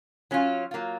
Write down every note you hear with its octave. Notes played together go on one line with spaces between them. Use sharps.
F#3 C#4 F4
F#3 A#3 F4